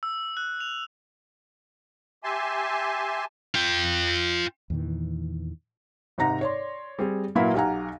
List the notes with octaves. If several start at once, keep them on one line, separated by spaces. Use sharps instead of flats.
E6
F#6
F7
G4 E5 G#5 A5 C6
F4 G5
E2 A#2 D#3 E3
G#1 C3 D#4 F#5 A#5 A#6
C#5 D5 C6
G3 C4 G#4
A#2 F#3 A#3 E4 B4 B5
B1 G4 F5 F#5 G#5 A#5